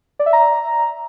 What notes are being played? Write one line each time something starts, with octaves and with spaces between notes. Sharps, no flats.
D5
E5
A#5